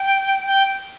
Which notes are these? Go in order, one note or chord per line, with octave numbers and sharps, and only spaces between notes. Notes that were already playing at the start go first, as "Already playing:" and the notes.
Already playing: G5
G5